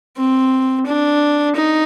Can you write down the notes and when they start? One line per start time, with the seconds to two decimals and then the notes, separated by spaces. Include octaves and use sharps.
0.17 C4
0.87 D4
1.55 D#4